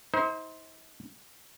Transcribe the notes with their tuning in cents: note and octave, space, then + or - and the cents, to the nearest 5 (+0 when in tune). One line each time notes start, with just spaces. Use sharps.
D#4 +45 C5 +0